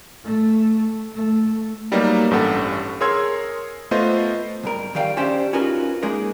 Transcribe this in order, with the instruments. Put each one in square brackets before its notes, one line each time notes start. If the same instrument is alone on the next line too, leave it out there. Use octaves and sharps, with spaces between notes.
[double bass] A3
A3
[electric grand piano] F#3 G3 A#3 B3 D#4
A1 G2 C#4 G4 A4 F#5
G#4 A#4 C#5 C6 E6 G#6
A3 B3 F4 C5 D#5
[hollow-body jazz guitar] C2 G2 A#4
D#3 G3 F5 G5
C#4 D4 G4 C5 D5 E5
C#4 D#4 F4 F#4 A#4 B4
G#3 A#3 D#4 G#4 A#4